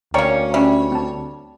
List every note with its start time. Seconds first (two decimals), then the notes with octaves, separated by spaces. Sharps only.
0.14 D2 A#3 C#4 C#5 D5 G5 A#5
0.54 G3 C#4 E5
0.92 C4 A5